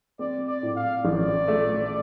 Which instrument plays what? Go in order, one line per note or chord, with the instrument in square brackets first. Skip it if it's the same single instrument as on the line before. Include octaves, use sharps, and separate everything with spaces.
[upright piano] C4 [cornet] D5
[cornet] D5
[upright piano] A2
[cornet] F5
[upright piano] A1 [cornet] D5
[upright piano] A3